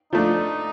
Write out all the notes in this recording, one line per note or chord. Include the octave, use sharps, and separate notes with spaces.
F3 A3 D4 D#4